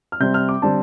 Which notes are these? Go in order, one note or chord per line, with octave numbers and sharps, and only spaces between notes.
F6
C3 G3 C4 G6
F6
D6
D3 G3 C4 A5